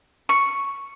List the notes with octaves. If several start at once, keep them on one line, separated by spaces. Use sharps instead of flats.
C#6